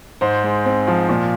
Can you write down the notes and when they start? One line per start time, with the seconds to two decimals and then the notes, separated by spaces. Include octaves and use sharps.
0.21 G#2 C5
0.44 G#3
0.66 C4
0.87 F3
1.09 A#2